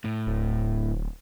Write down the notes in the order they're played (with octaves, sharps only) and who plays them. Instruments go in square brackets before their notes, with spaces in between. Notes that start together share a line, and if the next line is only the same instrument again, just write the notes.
[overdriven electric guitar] A2
[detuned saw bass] D1